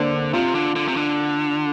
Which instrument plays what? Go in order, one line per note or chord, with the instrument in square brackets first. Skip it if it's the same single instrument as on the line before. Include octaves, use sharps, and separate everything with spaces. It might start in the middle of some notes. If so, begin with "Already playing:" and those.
Already playing: [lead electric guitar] D3 [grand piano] A#3 C4 D4
[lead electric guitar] C3 [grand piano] F4
[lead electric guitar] D3
D3
C3
D3